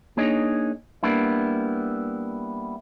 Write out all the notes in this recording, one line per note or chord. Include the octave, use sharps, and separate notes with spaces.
A#3 D4 D#4 G#4 C#5 D#5
G3 A#3 B3 D4 E4